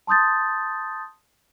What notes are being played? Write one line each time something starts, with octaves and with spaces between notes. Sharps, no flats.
A5 C6 D#6 G6 A6